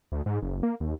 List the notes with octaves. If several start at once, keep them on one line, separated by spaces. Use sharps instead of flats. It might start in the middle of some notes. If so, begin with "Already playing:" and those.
D2
G#2
F#1
A#3
D#2